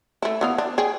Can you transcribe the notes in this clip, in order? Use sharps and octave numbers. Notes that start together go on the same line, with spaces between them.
A3 E4
E3 B3 F5
D4
G#4 G5